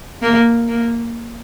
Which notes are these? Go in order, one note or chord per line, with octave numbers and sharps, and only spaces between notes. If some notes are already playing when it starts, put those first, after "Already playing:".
A#3
A#3